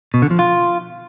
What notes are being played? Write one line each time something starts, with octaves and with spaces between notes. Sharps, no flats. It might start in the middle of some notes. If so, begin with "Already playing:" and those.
B2
D3
F3
F4